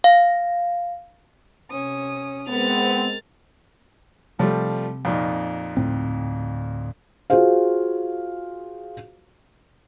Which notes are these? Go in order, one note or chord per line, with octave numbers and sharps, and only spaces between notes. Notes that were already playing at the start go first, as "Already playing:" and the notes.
F5
C3 C#4 D#6
G#3 B3 C4 A#4 A6 F7
C3 F3 G3 A3
F2 A#2 D#4
D2 A2 C4
F4 F#4 G#4 C5 F5